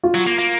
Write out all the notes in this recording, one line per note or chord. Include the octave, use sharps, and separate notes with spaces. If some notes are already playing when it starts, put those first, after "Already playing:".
F4
F#3
A#3
A#3